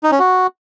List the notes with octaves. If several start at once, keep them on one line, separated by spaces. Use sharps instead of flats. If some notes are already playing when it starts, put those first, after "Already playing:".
D#4
C#4
F#4